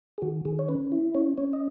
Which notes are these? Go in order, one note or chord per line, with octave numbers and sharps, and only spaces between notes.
G#4
D#3 F#4
D#3 G#4
C#5
C#4 B4
E4
C#4 C#5
C#4 C#5
D#5